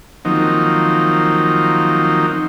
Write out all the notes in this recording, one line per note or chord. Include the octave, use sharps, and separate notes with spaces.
D#3 F3 F#3 A#3 C4 D#4